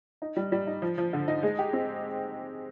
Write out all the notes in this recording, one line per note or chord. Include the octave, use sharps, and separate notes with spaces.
D#4
G3
G3
D#4
F3
F3
D3
D#4
G#3
G4
C4